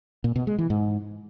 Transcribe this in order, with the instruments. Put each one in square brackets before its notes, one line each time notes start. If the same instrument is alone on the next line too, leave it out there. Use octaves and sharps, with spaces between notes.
[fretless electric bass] A#2
B2
G#3
E3
G#2